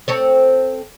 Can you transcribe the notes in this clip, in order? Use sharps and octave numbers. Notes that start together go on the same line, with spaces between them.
C4 A4 C#5